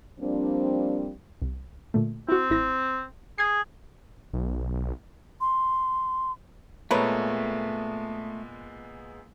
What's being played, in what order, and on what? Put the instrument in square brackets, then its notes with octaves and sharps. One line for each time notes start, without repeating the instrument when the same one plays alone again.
[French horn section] F3 G3 A#3 C4 D4
[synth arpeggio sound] C2
A#2 D3 A3
[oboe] C4 [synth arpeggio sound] E4 F#4
[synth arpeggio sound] A1 E4 A#6
[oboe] G#4 [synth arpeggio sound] G#6 C7
[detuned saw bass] B1
[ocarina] C6
[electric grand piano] A#2 G#3 B3 [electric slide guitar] A3 [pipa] A#4 B4 C#5